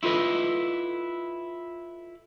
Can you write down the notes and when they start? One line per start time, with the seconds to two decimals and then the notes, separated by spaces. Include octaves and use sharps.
0.03 E4 F4 A4 B4 D#5